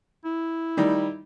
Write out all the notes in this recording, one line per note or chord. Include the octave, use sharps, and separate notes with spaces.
E4
D#3 G3 D#4